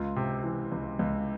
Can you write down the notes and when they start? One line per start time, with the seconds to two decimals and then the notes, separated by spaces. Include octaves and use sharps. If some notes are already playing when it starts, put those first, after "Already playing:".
Already playing: C#2 F4
0.16 C3
0.44 E3
0.72 C#2
0.99 C#2